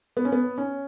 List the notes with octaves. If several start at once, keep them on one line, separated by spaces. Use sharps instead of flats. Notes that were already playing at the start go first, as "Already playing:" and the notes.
B3
C#4
B3
C#4